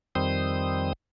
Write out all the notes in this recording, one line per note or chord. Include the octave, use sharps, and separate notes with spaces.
F2 D#3 G3 C4 C5 D#6